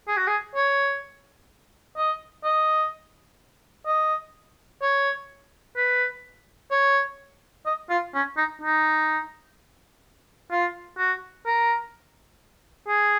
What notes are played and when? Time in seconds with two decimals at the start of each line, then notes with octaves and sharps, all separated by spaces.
0.08 G#4
0.17 F#4
0.27 G#4
0.55 C#5
1.97 D#5
2.44 D#5
3.87 D#5
4.82 C#5
5.76 B4
6.71 C#5
7.66 D#5
7.90 F4
8.14 C#4
8.37 D#4
8.62 D#4
10.51 F4
10.98 F#4
11.46 A#4
12.88 G#4